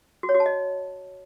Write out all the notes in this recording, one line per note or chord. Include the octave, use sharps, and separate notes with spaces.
F#4
C#5
F#4
A5
D#5